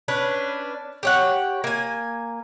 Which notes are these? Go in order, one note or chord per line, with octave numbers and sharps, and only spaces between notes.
C#4 D4 B4
G4 C#5 F#5
A#3 G#5